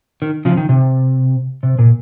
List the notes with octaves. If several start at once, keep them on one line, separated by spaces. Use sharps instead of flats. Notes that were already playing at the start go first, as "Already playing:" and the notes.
D#3
C#3 F3
D#3
C3
C3
A#2